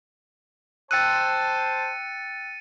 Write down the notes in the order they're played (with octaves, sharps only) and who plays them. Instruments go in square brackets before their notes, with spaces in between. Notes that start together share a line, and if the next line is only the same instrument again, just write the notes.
[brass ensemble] C5 A5 [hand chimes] G5 E6 F#6 [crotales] A6 C#7 D#7